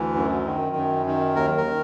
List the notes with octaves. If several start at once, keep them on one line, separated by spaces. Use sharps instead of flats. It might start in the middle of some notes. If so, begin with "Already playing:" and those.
Already playing: D2 E3
F#2
D#3
F#2
D#3
D#2 A#4
A#4
D#3